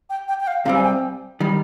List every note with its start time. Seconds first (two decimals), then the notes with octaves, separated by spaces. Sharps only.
0.09 G5
0.28 G5
0.40 G5
0.47 F5
0.65 C2 C3 G3 C4 F5
0.75 G#5
0.84 G5
1.40 D#3 G3